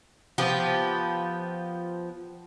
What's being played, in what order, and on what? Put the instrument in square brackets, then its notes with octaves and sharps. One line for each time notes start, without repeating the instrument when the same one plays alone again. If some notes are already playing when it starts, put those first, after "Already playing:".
[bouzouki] F3 B3 G4